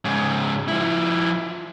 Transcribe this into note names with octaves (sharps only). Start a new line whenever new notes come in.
G#2 C#3
F3 E4